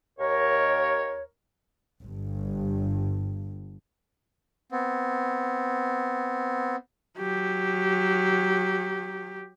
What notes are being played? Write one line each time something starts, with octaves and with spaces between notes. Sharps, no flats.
D#2 A#4 C#5
G1 G2
B3 C4
F#3 G4